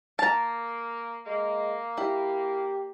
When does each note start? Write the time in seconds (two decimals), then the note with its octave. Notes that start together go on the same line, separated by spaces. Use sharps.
0.19 A#3 A5 A#5
1.26 G#3 A#3
1.98 E4 G4